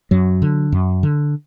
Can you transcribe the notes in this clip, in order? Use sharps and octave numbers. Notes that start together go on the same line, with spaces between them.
F#2 F#3
D3
F#2
D3